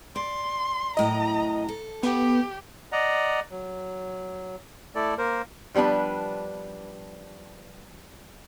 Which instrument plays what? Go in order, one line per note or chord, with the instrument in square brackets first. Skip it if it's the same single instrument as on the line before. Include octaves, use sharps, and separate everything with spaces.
[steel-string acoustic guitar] D5 [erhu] C6
[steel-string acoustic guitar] F#2 A2 [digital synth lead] D#5 [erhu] A#5
[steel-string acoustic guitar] A4
[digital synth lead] B3 [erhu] G4
[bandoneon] D5 D#5 F#5 A#5
F#3
A3 E4 A4 D5
A#3 A#4 C5
[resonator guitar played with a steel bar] F3 G3 B3 D4 B4